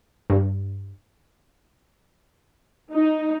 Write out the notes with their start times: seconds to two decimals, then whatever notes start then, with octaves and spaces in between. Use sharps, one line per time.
0.30 G2
2.92 D#4